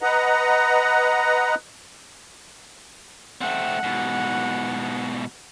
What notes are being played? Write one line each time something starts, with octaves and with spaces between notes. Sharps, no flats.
B4 D#5 F#5 A#5
A3 C4 F#5
G#2 B2